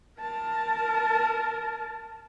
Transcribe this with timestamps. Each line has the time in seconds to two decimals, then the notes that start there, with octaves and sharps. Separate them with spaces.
0.20 A#4 A5